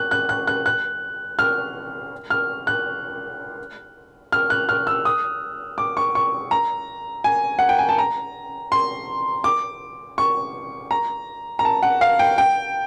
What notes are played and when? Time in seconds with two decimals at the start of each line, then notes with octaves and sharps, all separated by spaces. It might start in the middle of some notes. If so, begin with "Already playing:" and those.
Already playing: F#6
0.11 F#6
0.29 F#6
0.47 F#6
0.66 F#6
1.39 F6
2.30 F6
2.67 F#6
4.32 F6
4.50 F#6
4.69 F6
4.87 E6
5.05 D#6
5.78 D6
5.97 C#6
6.15 C#6
6.51 A#5
7.24 G#5
7.59 F#5
7.69 G5
7.79 G#5
7.89 A5
7.98 A#5
8.72 C6
9.44 D6
10.18 C#6
10.91 A#5
11.59 A#5
11.65 A5
11.83 F#5
12.01 F5
12.19 G5
12.38 G5